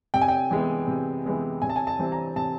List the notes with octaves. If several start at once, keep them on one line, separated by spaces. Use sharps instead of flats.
C3 G5
G#5
G5
E3 G#3 B3
C3
E3 G#3 B3
C3 G#5
A5
G#5
A5
E3 G3 C4
A#5
C3 A5